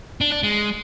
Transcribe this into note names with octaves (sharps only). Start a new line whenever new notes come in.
D4
D4
G#3